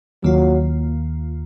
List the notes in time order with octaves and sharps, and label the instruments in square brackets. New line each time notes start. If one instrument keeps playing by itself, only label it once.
[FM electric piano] D#2 D#3 A#3 F4 [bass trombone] F#3